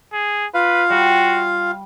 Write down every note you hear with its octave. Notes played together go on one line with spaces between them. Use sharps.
G#4
F4 B4 F5
G3 F#4